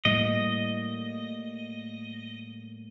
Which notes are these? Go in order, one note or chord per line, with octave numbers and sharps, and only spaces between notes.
A2 G3 A#3 D#5